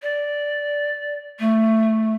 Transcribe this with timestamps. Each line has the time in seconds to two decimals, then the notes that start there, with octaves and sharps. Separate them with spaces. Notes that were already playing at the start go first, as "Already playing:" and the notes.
0.03 D5
1.39 A3